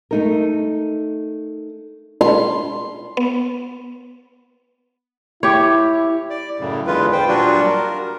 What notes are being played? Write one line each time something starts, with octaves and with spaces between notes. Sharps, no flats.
A3 D#4 A#4
C6
B3
E4 G4 C#5
D5
F#2 A2 C#3
E2 D3 G#3 F4 B4
B4 C5 G5
A#2 F#3 G3 D4 F4 F#4
A#4